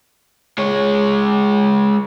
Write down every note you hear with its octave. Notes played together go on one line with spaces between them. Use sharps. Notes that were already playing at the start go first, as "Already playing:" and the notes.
G#3 C#5